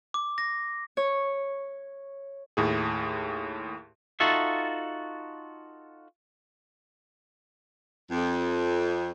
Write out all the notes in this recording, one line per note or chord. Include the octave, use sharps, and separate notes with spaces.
D6
A#6
C#5
D#2 A2 G#4
D#4 F4 F#4 A4 E5
F2